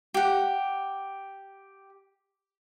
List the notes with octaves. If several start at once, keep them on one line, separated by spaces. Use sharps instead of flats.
G4 F#5